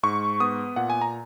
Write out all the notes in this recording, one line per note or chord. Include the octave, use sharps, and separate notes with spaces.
G#2 C#6
B3 D#6
A#2 F#5
G#5
A#5